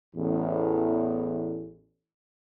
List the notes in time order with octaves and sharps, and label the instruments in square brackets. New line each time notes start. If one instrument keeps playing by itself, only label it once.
[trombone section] A1 E2